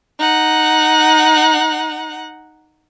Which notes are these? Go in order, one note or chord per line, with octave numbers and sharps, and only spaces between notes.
D#4 F#5